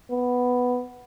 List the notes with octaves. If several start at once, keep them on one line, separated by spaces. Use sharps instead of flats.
B3